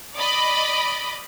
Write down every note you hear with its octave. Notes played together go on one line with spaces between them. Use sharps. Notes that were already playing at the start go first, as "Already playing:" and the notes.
D5 D#5 B5